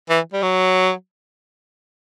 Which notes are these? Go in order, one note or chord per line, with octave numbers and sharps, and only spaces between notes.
E3
G3
F#3